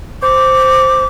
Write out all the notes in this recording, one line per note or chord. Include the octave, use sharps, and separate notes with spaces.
C5 D6